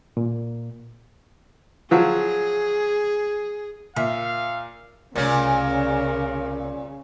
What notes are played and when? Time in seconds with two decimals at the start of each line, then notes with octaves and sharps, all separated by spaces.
0.17 A#2
1.91 F3 F#3 G#4
3.96 A#2 E5 F5
5.16 C2 A#2 C#3 A3 C#4 A#4